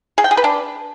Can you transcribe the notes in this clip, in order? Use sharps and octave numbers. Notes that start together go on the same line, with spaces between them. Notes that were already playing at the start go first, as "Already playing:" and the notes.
G#4
G5
G#4
B4
D4